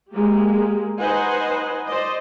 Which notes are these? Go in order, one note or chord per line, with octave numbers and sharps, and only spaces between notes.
G#3 A#3 G4
D#4 B4 C5 D#5 F#5 G#5
C5 D5 D#5